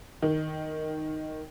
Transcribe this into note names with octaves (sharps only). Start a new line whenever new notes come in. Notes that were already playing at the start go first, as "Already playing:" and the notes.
D#3